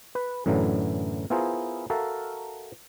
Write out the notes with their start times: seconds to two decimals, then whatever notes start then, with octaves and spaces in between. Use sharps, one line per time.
0.15 B4
0.46 F#2 A2 D3 E3 F#3
1.30 B3 E4 F4 G#4 A#4 C5
1.90 F#4 A4 A#4 E5 F5